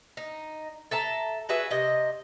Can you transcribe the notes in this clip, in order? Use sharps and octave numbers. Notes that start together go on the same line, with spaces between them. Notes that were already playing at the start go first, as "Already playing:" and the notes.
D#4
A4 E5 A5 A#5
F#4 G#4 B4 E5
C3 D#5